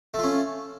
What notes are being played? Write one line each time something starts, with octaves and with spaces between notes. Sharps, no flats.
A3 C#4 F4